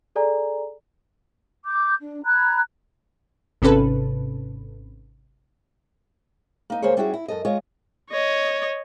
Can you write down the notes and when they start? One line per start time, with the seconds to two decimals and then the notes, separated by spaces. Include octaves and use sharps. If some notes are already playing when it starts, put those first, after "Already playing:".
0.16 G#4 A4 D5 G#5 A#5
1.65 D6 G6
2.00 D4
2.24 A#5 B5 F#6 G#6
3.62 G#1 C3 C#4 A4 B4
6.70 A#3 D#4
6.82 D2 A#3 G#4 C5 C#5
6.97 G3 C#4 E4 F#4 G#4
7.14 E4
7.28 F#2 A4 D#5
7.45 G#3 F4 C#5 D#5
8.11 C#5 D#5